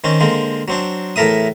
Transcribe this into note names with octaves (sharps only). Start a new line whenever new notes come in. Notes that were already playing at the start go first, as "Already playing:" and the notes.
D#3 C4 C#4
D3 G#3 A#3 C4
F#3 C4 D4
E2 A2 A4 A#4 E5 D#6